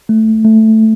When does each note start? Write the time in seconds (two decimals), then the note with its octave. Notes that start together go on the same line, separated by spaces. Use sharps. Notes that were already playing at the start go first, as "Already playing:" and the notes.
0.09 A3
0.45 A3